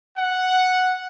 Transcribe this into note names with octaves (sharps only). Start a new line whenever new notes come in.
F#5